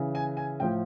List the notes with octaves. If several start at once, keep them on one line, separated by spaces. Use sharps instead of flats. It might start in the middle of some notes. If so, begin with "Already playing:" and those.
Already playing: C#3 E3
G#5
G#5
A2 F3 G5